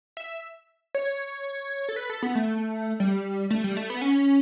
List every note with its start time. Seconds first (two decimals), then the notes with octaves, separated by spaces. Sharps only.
0.17 E5
0.95 C#5
1.89 A4
1.96 B4
2.10 A4
2.22 B3
2.35 A3
3.00 G3
3.50 A3
3.64 G3
3.77 A3
3.90 B3
4.02 C#4